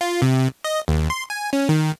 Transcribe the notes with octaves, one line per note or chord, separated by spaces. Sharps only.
F4
C3
D#5
D#2
C6
G#5
C#4
D#3